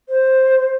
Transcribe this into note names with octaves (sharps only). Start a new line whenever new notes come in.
C5